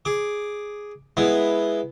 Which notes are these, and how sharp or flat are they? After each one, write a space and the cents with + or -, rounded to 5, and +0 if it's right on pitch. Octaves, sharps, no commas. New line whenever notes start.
G#4 +0 D6 +0
G#3 +0 B3 +0 E4 +0